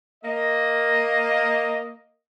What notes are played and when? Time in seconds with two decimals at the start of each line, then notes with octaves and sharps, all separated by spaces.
0.24 A#3 D#5